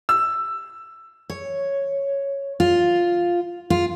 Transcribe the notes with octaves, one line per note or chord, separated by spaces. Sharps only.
E6
C#5
F4
F4